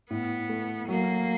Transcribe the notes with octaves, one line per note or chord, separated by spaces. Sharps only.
A2 B3
A3
F#3 A#3